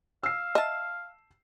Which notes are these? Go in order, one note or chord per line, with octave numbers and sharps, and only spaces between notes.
F5 E6 C7
D#5 E5 A5